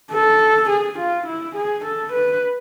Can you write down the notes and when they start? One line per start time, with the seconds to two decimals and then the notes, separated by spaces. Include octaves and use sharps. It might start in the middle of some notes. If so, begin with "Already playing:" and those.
0.13 A4
0.70 G#4
0.99 F4
1.27 E4
1.56 G#4
1.85 A4
2.13 B4